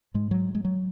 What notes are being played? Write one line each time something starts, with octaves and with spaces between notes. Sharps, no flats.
G#2 G#3
F#3
G#3
F#3